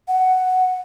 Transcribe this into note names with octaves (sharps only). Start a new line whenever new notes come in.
F#5